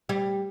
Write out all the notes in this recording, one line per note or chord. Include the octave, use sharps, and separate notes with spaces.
G3